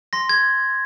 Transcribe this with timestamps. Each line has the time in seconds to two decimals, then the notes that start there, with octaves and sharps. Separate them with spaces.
0.13 C6 A#6
0.29 G#6